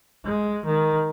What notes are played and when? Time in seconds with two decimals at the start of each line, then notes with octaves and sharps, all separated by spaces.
0.25 G#3
0.66 D#3